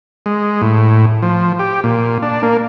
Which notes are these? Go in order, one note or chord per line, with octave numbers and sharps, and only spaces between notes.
G#3
A2
F3
G4
A#2
D4
A#3